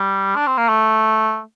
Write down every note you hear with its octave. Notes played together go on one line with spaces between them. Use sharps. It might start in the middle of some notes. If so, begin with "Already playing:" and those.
Already playing: G3
D4
C4
A#3
A3